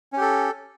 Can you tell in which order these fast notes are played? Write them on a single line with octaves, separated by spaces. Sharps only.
C#4 G4 A4